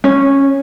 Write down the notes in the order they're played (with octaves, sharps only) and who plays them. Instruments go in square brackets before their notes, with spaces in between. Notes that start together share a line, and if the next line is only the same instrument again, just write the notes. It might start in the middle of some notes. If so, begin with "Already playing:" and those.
[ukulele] C#4